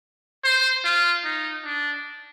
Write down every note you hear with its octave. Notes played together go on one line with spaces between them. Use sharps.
C5
F4
D#4
D4